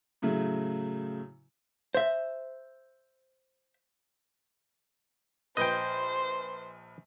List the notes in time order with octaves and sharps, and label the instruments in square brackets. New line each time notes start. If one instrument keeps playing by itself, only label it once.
[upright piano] A2 C#3 F#3 A3
[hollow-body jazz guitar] C5 E5
[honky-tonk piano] A#1 B4 G6 [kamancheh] C5 [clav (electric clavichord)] D#5 G5